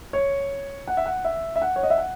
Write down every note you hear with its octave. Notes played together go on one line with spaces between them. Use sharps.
C#5
F#5
E5
F#5
E5
E5
F#5
C#5
D#5
E5
F#5